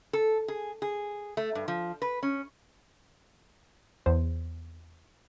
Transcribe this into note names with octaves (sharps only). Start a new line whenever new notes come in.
A4
G#4
G#4
A3
G2
F3
B4
C#4
E2 C5